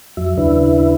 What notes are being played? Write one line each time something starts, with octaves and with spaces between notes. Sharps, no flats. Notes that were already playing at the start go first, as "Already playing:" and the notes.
F2 F#3 E5
D#2 C#3 D4 E4 B4 E5